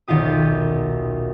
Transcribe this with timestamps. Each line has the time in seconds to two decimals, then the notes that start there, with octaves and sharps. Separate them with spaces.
0.08 D#1 B1 D#3 F4 G4 D#6